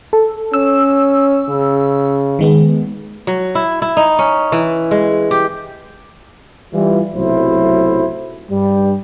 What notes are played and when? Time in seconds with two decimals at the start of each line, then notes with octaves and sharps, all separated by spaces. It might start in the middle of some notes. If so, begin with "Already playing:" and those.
0.13 A4
0.54 C#4 E6
1.49 C#3
2.39 D#3 G#3 B3
3.27 F#3
3.55 E4
3.82 E4
3.97 D#4
4.19 C#4
4.52 E3
4.91 G#3
5.31 G4
6.74 E3 G3 F4
7.15 B1 C3 F#3 A3 E4 C5
8.50 G2 G3